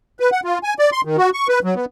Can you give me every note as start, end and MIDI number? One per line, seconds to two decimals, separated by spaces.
0.20 0.30 71
0.32 0.40 78
0.44 0.58 65
0.63 0.74 80
0.79 0.90 74
0.92 1.01 84
1.05 1.17 51
1.18 1.30 66
1.34 1.47 85
1.48 1.59 71
1.64 1.74 54
1.76 1.85 59